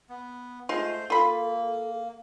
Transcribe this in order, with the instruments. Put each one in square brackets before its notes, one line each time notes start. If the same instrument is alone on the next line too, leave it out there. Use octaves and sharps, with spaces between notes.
[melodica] B3
[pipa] G#3 F4 [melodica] A3 C5 C6
[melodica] A#3 [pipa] F4 B5 [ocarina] A4